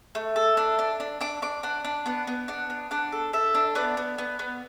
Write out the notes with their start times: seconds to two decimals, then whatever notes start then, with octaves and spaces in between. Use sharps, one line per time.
0.15 A3
0.36 A4
0.57 D4
0.79 D4
1.00 D4
1.21 D4 D6
1.42 D4 D6
1.63 D4 F#5
1.85 D4
2.06 B3 F#5
2.27 B3
2.48 D4 F#5
2.70 B3
2.91 D4 F#5
3.12 A4
3.33 A4 E5
3.55 D4
3.75 B3 D5
3.97 B3
4.18 B3
4.39 B3